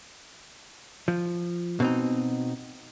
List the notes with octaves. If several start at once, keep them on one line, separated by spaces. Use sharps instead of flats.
F3
B2 C4 D#4